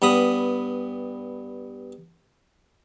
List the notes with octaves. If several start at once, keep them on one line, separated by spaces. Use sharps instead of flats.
G2 B3 B5 D#6